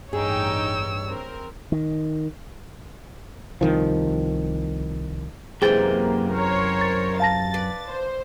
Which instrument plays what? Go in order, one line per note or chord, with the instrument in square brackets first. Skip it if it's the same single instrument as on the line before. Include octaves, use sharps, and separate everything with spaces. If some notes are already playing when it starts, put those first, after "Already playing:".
[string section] A1 D#4 G5 [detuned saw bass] G2 [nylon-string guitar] G#4 [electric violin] C#5 E6
[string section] C4 A#4
[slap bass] D#3
[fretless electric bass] C2 D#3 F3
[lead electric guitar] F#2 G5 [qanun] C3 E3 G#3 [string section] A#3 [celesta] G#4 A6
[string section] A#4 C5 C#5
[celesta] A6
[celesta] F5 A5 A#6 [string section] A6
[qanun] B4 D5
[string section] C5